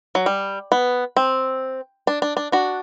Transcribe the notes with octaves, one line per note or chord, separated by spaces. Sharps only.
F#3
G3
B3
C4
D4
D4
D4
D4 F#4